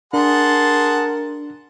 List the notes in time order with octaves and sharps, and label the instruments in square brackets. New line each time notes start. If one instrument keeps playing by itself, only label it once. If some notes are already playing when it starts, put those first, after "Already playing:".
[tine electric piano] D4 [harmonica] G#4 F#5 C6 [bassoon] A#4 [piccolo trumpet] A5